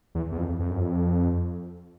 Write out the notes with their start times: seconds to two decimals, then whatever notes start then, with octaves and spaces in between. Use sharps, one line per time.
0.15 E2
0.32 E2
0.37 F2
0.59 F2
0.70 F#2
0.81 F2